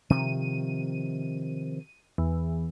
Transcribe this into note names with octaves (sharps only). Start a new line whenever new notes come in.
C3 D#3 F3 D#7
E2